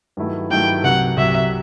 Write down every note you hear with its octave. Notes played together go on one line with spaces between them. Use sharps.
G2 D#3 F#3 A3 E4
G2 D#3 F#3 A3 E4 G5
C2 C3 F#3 F#5
C2 C3 F#3 E5